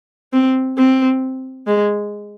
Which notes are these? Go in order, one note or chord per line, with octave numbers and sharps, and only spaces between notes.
C4
C4
G#3